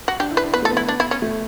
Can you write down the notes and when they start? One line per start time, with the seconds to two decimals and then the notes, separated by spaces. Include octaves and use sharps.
0.08 F#4
0.20 D4 G4
0.31 E4
0.37 B4
0.43 D4
0.54 B3 B4
0.62 A3 A4
0.70 B3
0.77 E4
0.88 D4
1.00 E4
1.11 C#4
1.22 A3